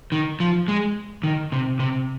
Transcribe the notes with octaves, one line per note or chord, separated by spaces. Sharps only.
D#3
F3
G#3
D#3
C3
C3